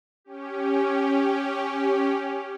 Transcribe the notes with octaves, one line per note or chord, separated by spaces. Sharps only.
C#4 G4